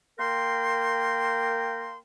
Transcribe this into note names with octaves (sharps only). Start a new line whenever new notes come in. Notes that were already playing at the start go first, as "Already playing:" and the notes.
A#3 A#4 G5 C6